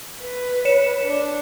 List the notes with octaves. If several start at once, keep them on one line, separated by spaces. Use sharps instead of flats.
B4
C#5 C#7 E7
D4